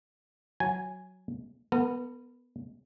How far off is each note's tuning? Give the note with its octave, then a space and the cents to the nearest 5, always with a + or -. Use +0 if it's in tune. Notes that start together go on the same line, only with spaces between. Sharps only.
F#3 +0 G#5 +0
B3 +0 A#4 -35